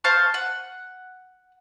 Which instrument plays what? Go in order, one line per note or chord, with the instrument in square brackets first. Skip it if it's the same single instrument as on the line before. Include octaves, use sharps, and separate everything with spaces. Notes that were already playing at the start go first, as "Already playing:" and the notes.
[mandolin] C5 F5 A5 C#6
F#5